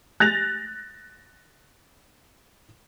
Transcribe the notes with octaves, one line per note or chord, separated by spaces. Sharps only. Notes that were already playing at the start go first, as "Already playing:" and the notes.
F#6 A6 A#6 F7